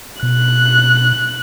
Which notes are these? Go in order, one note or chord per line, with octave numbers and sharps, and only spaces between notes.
B2 F#6